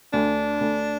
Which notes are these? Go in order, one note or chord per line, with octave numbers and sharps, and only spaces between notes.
D2 D4
D2